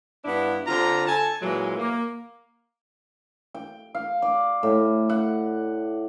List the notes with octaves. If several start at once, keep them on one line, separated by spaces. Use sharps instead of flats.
G2 B3 D4 E4
D3 C4 F4 A#5
A4 G#5 A5
A#2 E3 F#3 G#3
A#3
G5
F5
D5
A2
F#5